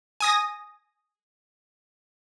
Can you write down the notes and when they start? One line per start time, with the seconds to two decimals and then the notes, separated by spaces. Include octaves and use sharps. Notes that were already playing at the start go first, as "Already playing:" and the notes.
0.20 G#5 D#6 A#6